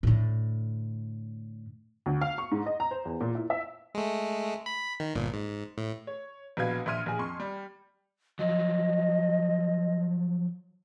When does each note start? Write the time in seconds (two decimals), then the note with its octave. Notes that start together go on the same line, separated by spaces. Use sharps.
0.03 A2 D3
2.06 D2
2.21 F5
2.38 C#6
2.52 G#2
2.66 D#5
2.80 A#5
2.91 C5
3.05 E2
3.21 A#2
3.35 E4
3.50 E5
3.95 G#3 A3
4.66 B5
5.00 D#3
5.15 G1 A#2
5.33 G#2
5.78 A2
6.07 C#5
6.57 A#1 B2 B4 F5 G#6
6.86 A#1 E5 C6 F6 D#7
7.06 A#1 G#4
7.19 F2 C6 C#6
7.40 G3
8.39 F3 F#3 D#5